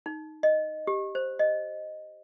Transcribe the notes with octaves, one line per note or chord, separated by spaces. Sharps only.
D#4
D#5
G4
C5
D#5